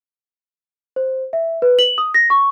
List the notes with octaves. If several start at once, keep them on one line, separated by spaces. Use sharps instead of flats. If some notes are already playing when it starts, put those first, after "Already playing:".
C5
E5
B4
F#7
D#6
A#6
C#6